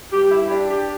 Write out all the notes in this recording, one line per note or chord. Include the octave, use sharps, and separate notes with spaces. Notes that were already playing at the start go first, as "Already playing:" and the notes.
G2 G4
E4
D4 G4
G4